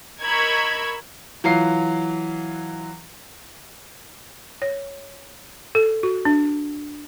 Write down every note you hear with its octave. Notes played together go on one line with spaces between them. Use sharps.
A#4 D#5 B5 C#6 E6 G#6
E3 F#3 F4 C7
C#5
A4
F#4
D4